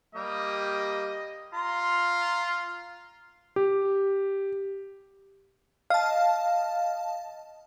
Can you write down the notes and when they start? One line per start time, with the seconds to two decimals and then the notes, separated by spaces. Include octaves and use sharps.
0.15 G3 A#3 G4 D#5
1.54 F4 A#5 C6
3.56 G4
5.90 D#5 F5 A5